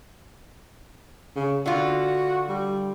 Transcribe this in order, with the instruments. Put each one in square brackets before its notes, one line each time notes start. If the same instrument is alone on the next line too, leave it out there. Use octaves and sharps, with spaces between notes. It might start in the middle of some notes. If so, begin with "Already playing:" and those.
[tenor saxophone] C#3
[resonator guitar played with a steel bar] D3 F4 [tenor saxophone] F#4
[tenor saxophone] G3